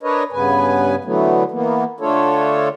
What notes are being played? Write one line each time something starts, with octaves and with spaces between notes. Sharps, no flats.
D4 A#4 B4 C#5 D#5
G2 C#3 B3 B4 G#5
D3 E3 F#3 A3 B3
E3 A#3 B3
D3 A3 D4 F4 A4 C#5